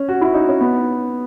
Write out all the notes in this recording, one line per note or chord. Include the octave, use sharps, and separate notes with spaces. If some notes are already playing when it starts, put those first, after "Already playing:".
Already playing: C#4
F#4
E4
D#4
C#4
B3